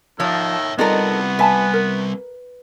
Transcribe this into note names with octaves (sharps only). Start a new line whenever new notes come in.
D#3 F3 C#5 E5 E6
G3 B3 C4 D#4 F4 A4 A#4 D5
B4 E5 G#5 A5
A#4